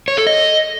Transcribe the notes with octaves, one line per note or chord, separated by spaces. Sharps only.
C#5
A4
D#5